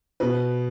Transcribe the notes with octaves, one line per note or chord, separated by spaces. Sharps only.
B2 B4